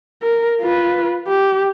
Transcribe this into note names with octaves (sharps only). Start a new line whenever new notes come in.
A#4
F4 B4
G4